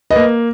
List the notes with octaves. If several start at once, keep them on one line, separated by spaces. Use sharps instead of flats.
B4 D#5
A#3